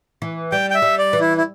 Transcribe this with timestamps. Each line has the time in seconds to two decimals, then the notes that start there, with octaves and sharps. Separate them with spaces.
0.22 E3
0.52 G3 G5
0.70 G5
0.75 E5
0.82 G3
0.98 D5
1.13 E3
1.21 E4
1.37 E4